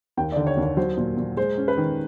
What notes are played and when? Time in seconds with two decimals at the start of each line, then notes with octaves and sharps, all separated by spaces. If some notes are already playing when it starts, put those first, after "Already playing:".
0.17 D#2 G5
0.32 D3 D5
0.47 C#5
0.57 D#2
0.62 C#5
0.77 F#3 C5
0.97 A#2
1.17 A#2
1.37 G#3 C5
1.58 C#4
1.68 B4
1.77 D#3